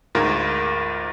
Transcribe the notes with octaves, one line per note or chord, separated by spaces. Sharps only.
D2 G#2 F4 A#4